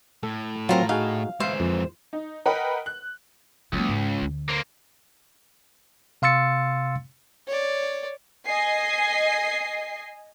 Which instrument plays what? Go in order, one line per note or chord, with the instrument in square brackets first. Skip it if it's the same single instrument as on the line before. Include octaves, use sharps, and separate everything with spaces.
[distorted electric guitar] A2 [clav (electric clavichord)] A4
[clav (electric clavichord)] F#3 C4 [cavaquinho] F4 A#4 A#5
[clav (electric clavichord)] D#4 F#4 G#4 [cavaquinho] F5
[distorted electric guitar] G#2 E3 [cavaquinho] C5 [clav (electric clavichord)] E5 F5
[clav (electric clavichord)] F2
[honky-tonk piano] D#4
A#4 B4 D#5 F#5 G5 B5
F#6
[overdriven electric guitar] C#2 [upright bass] F#3 A#3
[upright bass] G#2
D2
[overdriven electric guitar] A#3 C4
[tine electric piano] C3 F5 C6 E6 A6 C#7
[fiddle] C#5 D5
[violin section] D#5 G#5 C7